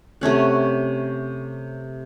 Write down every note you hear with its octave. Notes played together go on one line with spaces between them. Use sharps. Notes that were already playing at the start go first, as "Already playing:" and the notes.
C3 A3 C#4 F#5